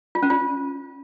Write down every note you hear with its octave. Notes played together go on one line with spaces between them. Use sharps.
F4
C#4
F4